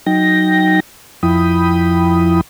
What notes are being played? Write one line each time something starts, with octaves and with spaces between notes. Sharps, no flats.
F#3 D#4 G5 A#6
F2 F3 E4 G5 B5 D#6